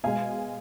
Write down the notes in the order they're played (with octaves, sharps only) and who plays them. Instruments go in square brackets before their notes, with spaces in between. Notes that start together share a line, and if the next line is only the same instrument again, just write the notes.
[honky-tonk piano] B2 G#3 F5 G#5